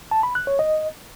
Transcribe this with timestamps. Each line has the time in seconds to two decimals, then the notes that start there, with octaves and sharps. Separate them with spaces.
0.11 A5
0.23 B5
0.35 F#6
0.47 C#5
0.59 D#5